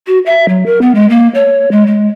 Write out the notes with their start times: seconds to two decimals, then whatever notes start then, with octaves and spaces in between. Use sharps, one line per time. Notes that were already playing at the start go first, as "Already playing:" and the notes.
0.07 F#4
0.26 E5
0.49 F#3
0.66 A#4
0.82 B3
0.95 G#3
1.10 A#3
1.35 C#5
1.72 G#3
1.87 G#3